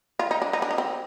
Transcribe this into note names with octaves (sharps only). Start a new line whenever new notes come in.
F4
D#4
D4
D#4
D4
D#4
C4